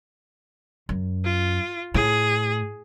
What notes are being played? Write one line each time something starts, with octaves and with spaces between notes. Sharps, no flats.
F#2
F4
A2 G#4